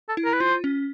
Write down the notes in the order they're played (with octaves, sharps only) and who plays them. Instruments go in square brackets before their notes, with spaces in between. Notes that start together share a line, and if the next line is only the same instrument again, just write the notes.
[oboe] A4
[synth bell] E4
[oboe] A#4
B4
[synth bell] F4 [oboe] C5
[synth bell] C#4